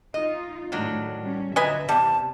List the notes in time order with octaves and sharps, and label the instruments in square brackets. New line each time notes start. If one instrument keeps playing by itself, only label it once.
[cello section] D#4 F4 [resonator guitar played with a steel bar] D#5
[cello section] A2 [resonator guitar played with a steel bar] D#3 F#3 D4
[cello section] G3 C#4
[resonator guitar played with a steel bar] A#2 F#3 [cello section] D3 E5 [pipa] B4 D#5 G#5
[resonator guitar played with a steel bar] E2 B3 [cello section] C3 [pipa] G3 [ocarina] A5